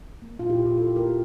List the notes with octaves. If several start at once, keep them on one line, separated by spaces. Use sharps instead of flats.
A#3
A#2 F4
E4 G4
A#2
G4
A#2 F4 A4
A#3 G4 A#4